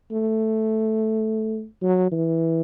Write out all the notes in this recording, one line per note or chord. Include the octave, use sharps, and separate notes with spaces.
A3
F#3
E3